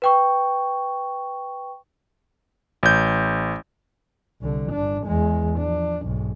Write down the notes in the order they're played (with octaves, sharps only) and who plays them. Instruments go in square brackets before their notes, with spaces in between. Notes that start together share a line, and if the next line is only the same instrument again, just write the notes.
[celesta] B4 G5 C#6
[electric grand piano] A1 G6
[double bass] C2 D3
G1 D4
E2 G#3
F3 D4
B1 G#2